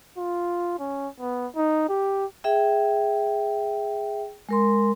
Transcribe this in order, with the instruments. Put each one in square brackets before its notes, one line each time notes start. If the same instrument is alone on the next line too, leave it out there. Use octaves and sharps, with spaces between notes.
[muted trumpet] F4
C#4
B3
D#4
G4
[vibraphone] G#4 E5 G5
G#3 A#4 C6